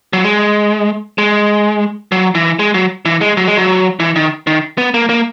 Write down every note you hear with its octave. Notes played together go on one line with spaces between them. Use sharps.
F#3
G#3
G#3
F#3
E3
G#3
F#3
E3
G#3
F#3
G#3
F#3
E3
D#3
D#3
B3
A#3
A#3